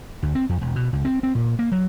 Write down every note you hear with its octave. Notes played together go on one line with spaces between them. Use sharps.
D2
C4
F2
E1
B2
C#2
C4
C4
A#2
A#3
F#3